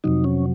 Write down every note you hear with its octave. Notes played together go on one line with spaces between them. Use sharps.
F2 C3 F#3 D#4
C#4